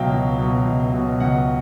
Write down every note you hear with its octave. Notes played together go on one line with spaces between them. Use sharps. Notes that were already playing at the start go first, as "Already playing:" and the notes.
Already playing: C#2 B2 F#3 E5 F5 G5
C#2
B2 F#3
C#2
B2 F#3
C#2 F#5